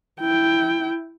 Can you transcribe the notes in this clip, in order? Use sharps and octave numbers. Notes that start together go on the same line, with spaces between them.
E4 G5